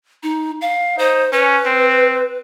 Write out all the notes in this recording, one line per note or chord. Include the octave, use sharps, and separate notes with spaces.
D#4
F5
D#4 C5
C#4 B4
C4